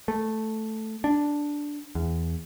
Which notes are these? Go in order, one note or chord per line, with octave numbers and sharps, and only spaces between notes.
A3
D4
E2